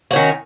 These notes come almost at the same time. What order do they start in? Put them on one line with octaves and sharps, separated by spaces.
F#4 C#4 D#3